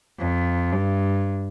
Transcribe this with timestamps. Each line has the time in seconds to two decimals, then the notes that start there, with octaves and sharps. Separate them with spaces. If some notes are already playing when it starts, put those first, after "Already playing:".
0.20 F2
0.72 G2